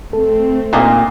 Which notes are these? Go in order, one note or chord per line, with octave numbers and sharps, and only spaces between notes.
A3 C4 A4
A#2 D4 D#4 G4